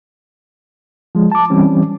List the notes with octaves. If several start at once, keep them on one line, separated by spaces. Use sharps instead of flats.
F3 G#3
A5 D6
E3 G3 C4 C#4